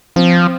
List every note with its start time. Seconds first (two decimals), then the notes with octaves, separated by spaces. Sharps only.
0.16 F3 C4